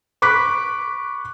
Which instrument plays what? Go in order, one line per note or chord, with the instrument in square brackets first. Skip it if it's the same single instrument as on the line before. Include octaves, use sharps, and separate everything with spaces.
[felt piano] B5 C#6 D6 F#6 B6